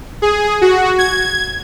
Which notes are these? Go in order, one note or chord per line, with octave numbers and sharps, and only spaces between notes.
G#4
F#4
G#6